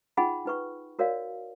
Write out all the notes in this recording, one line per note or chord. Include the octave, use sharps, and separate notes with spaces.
D#4 F4 G#4 F#5 G5 B5
D#4 B4 C#6
F#4 A#4 C#5 D5 F5